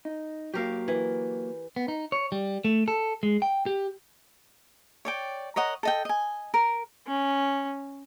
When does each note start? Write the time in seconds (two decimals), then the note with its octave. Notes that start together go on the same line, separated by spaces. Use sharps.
0.05 D#4
0.54 F#3 A#3 G4 A#4 F5
0.88 E3
1.76 B3
1.88 D#4
2.12 C#5
2.32 G3
2.65 A3
2.88 A4
3.23 G#3
3.42 G5
3.66 G4
5.05 C#5 D5 G5
5.56 A#4 C#5 D#5 F#5
5.83 A4 D#5 G5
6.05 D#5 G#5
6.54 A#4
7.07 C#4